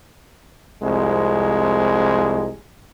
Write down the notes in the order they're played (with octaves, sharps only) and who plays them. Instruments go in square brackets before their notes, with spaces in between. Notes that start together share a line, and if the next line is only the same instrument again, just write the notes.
[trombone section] C2 F2 G#3